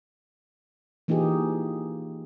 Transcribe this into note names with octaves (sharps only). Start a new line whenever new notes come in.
E3 A#3 D#4 F4 G4 G#4